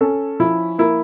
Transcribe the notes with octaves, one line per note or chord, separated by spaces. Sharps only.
C#4 A4
F3 E4
A#3 E4